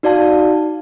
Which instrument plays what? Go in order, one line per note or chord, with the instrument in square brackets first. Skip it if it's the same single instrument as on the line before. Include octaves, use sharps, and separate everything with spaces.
[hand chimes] D#4 F#4 D5 F5 A5